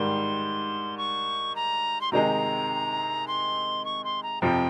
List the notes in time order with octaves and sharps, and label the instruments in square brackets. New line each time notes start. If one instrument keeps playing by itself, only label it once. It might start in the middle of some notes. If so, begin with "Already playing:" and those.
Already playing: [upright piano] G#2 D#3 G3 [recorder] C6
[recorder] C#6
A#5
C6
[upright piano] C3 D#3 G#3 D#4 [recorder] A#5
[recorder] C6
C#6
C6
A#5
[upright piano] F2 C3 F3 [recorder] G5